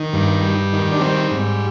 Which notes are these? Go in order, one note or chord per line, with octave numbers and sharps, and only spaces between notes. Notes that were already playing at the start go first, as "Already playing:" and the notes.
Already playing: D#3
G2
G3
D#3
D4
G3 C4
G#2